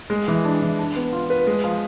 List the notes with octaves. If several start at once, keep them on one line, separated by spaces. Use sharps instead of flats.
G#3
E3
D4
E3
D4
B3
F4
B4
G#3
F3